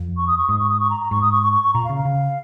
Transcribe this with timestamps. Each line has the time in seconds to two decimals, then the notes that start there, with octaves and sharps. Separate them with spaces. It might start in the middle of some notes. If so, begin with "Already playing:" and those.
Already playing: F2
0.17 C#6
0.28 D#6
0.38 C#6
0.49 G#2 D#6
0.59 C#6
0.70 D#6
0.80 C#6
0.90 A#5
1.01 A#5
1.11 G#2 C#6
1.22 D#6
1.32 C#6
1.42 C#6
1.53 C#6
1.64 C#6
1.74 A#2 A#5
1.85 F5
1.89 C#3
1.95 F5
2.05 C#3